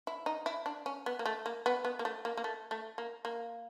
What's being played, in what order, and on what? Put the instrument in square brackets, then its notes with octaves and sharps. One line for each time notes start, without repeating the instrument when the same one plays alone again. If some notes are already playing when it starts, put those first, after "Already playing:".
[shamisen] E4
D#4
E4
D4
C#4
B3
A#3
A3
A#3
B3
B3
A#3
A3
A#3
A#3
A3
A3
A#3
A#3